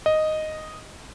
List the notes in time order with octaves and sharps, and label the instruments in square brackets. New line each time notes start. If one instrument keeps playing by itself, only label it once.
[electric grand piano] D#5